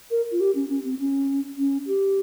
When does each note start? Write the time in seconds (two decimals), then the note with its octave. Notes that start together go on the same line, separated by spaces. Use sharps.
0.11 A#4
0.32 F4
0.40 G4
0.55 C#4
0.69 C#4
0.84 C4
0.99 C#4
1.57 C#4
1.87 G4